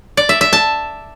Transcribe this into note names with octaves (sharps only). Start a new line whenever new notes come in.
D5
E5
E5
A5